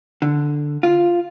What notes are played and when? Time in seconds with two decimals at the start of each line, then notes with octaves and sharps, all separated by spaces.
0.22 D3
0.83 F4